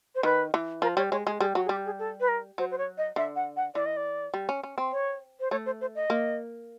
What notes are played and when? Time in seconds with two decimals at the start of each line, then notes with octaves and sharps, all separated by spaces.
0.15 C5
0.23 D#3 B4
0.54 E3
0.82 F3 A#4
0.97 G3 C#5
1.11 G#3 C#5
1.26 G#3 G#4
1.40 G3 G#4
1.55 F#3 F#4
1.65 G#4
1.69 G3 G4
1.86 G#4
1.99 A4
2.20 B4
2.28 A#4
2.58 F#3 C5
2.71 C5
2.78 C#5
2.98 D#5
3.16 D3 E5
3.36 F#5
3.56 F#5
3.75 E3 D5
3.86 D#5
3.97 D5
4.34 G3
4.49 C#4
4.63 C#4
4.78 C4
4.92 C#5
5.40 C5
5.51 A3 C#5
5.66 C5
5.81 C5
5.95 D#5
6.10 A#3